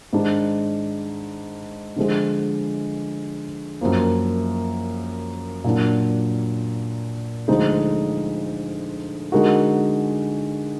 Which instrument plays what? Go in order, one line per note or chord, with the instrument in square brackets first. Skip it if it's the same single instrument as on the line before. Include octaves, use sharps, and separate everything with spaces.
[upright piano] G#2 D#3 G#3 D4
D3 F3 G#3
F#2 F3 A#3
A#2 F#3 D4
D2 D3 F3 G#3 D#4
D3 G#3 D#4 F#4 A#4